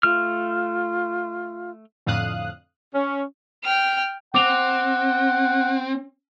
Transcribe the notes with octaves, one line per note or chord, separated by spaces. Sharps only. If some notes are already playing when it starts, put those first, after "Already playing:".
A3 F4 F6
F2 A2 D3 F5 D#6 F#6
C#4
G5 F6
C4 F#5 D6 F7